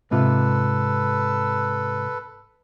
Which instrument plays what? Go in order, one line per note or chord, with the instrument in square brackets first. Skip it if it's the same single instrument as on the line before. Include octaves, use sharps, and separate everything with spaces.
[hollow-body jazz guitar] G#2 C3 F4 [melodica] A4 B4